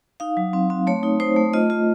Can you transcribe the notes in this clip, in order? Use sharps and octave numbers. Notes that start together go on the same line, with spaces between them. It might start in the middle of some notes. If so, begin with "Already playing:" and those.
D#4 F5
F#3
C4
C4
A3 C#5
D#4
D#4 C5
A3
F4 D#5
F4